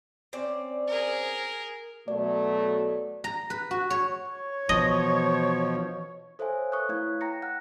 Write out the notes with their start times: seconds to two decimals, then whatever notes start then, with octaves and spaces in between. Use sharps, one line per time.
0.33 C4 C#4 D5
0.87 G#4 A#4
2.08 B2 F#3 A3 D5
3.24 A#5
3.50 B4
3.71 F#4
3.90 C#5
4.31 C#5
4.69 B2 E3 F3 D#5
6.39 A4 C5 C#5 E5 F5 G#5
6.72 B4 C#6 D#6 F#6
6.89 A3 E4 C#5 F5 C#6 G#6
7.21 G5 A#5 A#6 C#7
7.42 F#5 A#5 F6 F#6